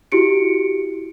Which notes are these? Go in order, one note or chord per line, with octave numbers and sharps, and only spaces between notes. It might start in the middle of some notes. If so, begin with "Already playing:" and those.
E4 F#4 G4 C#7 D7